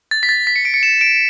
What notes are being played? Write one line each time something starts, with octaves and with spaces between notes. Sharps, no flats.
A6
B6
A6
B6
C#7
D7
C#7
E7
D7